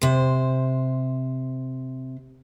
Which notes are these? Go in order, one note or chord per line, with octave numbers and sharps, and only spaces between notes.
C3 C5